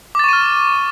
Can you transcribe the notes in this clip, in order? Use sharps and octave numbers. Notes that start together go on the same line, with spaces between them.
C#6 D6 F6 A6 D#7